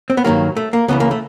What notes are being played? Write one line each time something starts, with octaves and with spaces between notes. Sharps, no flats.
C4
B3
G2 D#3 F#3 A#3
A3
A#3
C#2 C#3 E3 B3
A#3
A3